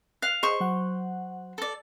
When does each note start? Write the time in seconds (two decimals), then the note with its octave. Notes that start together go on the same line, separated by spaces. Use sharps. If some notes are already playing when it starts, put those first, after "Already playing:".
0.22 F5 F#6
0.43 G#4 C5 D#5 C#6
0.60 F#3 F#5
1.58 A4 D5